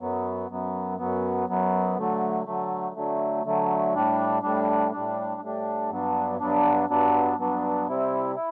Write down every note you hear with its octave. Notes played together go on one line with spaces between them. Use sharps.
F#2 F#3 B3
F#2 F#3 B3
F#2 F#3 B3
F#2 F#3 B3
D3 F#3 A3
D3 F#3 A3
D3 F#3 A3
D3 F#3 A3
A2 G3 D4
A2 G3 D4
A2 G3 D4
A2 G3 D4
G2 F#3 B3 D4
G2 F#3 B3 D4
G2 F#3 B3 D4
G2 F#3 B3 D4
C3 G3 C4 E4
E4